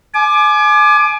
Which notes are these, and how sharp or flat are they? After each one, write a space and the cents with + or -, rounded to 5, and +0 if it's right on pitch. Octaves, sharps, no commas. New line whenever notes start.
G#5 +30 D6 +20